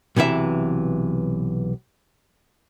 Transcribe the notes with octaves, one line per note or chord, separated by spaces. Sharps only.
B1 C3 E3 E5